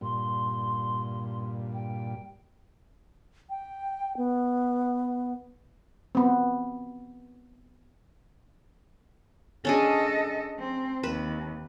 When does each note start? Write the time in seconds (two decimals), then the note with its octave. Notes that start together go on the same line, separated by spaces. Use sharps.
0.01 G2 A#2 C6
1.73 G5
3.50 G5
4.17 B3
6.15 B3 C4
9.65 C#4 D4 G#4 A4 D#5
10.59 C4
11.03 D#2 B4